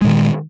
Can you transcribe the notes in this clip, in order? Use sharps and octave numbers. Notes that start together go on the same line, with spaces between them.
A#2 D#3 G#3